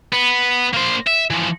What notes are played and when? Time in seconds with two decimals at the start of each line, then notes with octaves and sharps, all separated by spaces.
0.13 B3
0.74 A#3 C5
1.07 E5
1.30 E3 F3